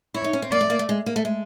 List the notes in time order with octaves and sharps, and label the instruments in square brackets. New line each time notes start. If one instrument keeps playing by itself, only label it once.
[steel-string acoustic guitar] E4 [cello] C#5
[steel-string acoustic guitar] D#4
C#4
C4
[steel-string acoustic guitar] A#3 [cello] D5
[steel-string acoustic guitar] A3
A#3
A3
G#3
A#3
A3
G#3